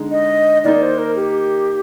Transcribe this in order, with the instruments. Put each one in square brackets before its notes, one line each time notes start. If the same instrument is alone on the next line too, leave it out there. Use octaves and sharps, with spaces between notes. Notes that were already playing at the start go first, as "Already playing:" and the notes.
Already playing: [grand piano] D3 G#3 D#4
[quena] D#5
[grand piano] D#3 A#3 D#4 [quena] D5
[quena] C5
A#4
G4